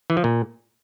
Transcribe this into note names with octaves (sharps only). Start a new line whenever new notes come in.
E3
F3
A#2